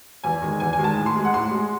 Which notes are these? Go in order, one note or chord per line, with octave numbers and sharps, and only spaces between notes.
E2 G#5
D#3 G#3
E2 G#5
G#5
D#3 G#3
A5
A2
C6
G#3
F#5
A2 C6
G#3